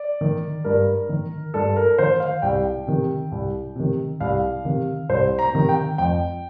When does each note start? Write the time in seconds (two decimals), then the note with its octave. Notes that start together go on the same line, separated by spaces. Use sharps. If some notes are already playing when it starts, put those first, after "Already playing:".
Already playing: D5
0.21 D#3
0.64 G2 A#4
1.09 D#3
1.54 G2 A4
1.76 A#4
1.98 D#3 C5
2.20 F5
2.42 C2 G5
2.87 C3 D#3
3.32 C2
3.76 C3 D#3
4.20 C2 F5
4.65 C3 D#3
5.09 C2 C5
5.39 A#5
5.53 C3 D#3
5.69 G5
5.98 F2 G5